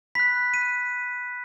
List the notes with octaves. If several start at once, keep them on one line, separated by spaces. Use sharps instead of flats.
B5 F#6 B6
D#7